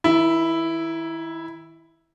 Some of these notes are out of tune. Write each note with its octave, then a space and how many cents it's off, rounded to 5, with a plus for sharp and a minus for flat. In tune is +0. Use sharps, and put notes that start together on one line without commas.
D#3 +35 E4 +0